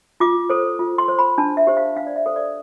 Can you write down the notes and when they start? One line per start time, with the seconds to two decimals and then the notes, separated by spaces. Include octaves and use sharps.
0.20 F4 D6
0.50 A4 C5
0.79 F4
0.98 C6
1.08 C5
1.19 B5
1.38 D4 A5
1.57 E5
1.67 G4 C5
1.77 F5
1.96 D4 F5
2.07 D5
2.16 E5
2.26 A4 C5
2.36 D5